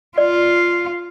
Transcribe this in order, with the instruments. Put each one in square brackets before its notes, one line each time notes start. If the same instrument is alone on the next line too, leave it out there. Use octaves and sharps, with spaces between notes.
[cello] F4 [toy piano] D5